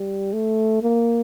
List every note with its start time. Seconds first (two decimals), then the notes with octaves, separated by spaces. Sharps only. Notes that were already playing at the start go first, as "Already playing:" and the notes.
Already playing: G3
0.33 A3
0.82 A#3